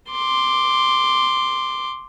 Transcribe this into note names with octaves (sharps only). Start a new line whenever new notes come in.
C6 D6